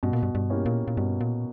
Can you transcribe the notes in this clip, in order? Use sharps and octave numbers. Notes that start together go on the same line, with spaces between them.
G2 B2
A#2
G2
G2
A#3 C#4 E4 G4
A#2
A#2
G2 B2
A#2